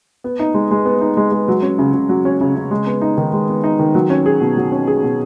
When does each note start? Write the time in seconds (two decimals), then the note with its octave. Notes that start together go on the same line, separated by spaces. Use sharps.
0.24 B3
0.40 D#4
0.54 G#3
0.71 G#3
0.86 B3
1.01 D#4
1.17 G#3
1.32 G#3
1.48 F#3
1.63 C#4
1.79 C#3
1.93 C#3
2.09 F#3
2.25 C#4
2.41 C#3
2.56 C#3
2.71 G#3
2.87 B3
3.01 D#4
3.18 D#3
3.33 G#3
3.48 B3
3.64 D#4
3.79 D#3
3.95 F#3
4.10 C#4
4.26 G#4
4.41 B2
4.57 F#3
4.72 C#4
4.87 G#4
5.03 B2